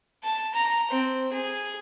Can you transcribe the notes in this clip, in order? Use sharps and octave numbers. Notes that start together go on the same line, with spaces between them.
A5
A#5
C4
G#4